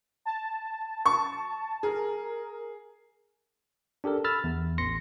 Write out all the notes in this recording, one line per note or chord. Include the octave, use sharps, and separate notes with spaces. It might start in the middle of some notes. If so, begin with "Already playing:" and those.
A5
C#6
G#4 A#4
D4 G4 A4 A#4
B5 E6 F6 A6
E2
A1 C6 A#6 C#7